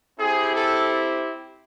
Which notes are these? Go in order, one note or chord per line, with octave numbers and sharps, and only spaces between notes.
C4 E4 G4 G#4
A4